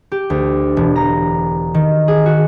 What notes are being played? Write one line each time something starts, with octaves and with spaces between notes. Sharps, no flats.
G4
D2
E1
A#5
D#3
G#4
F#4